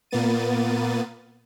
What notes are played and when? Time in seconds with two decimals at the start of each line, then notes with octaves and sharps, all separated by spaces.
0.11 A#2 A#3 B3 A6 D#7